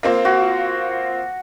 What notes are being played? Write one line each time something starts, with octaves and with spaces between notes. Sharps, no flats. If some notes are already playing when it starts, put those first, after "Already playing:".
A#3 C4 F4
F#4